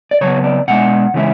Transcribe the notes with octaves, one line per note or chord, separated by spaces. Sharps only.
D5
C#3 F#3 B3 C#5
D5
B2 G#3 D4 F#5
C#3 E3 G#3 C#4 E4